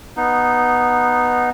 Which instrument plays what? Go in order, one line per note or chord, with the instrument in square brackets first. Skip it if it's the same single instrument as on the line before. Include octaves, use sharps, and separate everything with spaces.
[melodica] B3 D#4